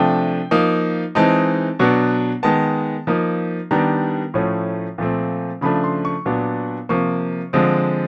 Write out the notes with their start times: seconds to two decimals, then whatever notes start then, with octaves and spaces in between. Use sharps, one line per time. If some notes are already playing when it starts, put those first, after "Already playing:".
Already playing: C3 F3 A3 D4 G5
0.51 F3 A#3 D#4
1.15 E3 G#3 C4 D#4 A5
1.79 B2 F#3 B3 D4
2.43 D#3 G#3 B3 A5
3.07 F3 A#3 D#4
3.71 D#3 G3 B3 D4 A#5
4.34 A2 F3 A3 C#4
4.98 A#2 F3 A3 C4
5.61 C#3 F3 A3 D4 B5
5.84 C6
6.05 C#6
6.26 A#2 F#3 B3 D4
6.89 C3 F3 A#3 C#6
7.53 D3 F3 G#3 C4